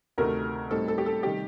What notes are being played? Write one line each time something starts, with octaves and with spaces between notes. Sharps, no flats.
D2 C3 D#3 A3 A#4
A2 G3 C4 D#4 A4
A4
G4
A4
C3 D#3 G3 G4